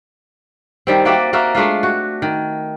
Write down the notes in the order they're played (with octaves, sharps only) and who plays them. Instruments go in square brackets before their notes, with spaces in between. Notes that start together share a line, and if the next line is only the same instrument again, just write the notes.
[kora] D#3 G3 C4
A#3 F#4 D5 E5
A#3 F#4 A#4 E5
G#3 A3 D4 F4
F#4
D#3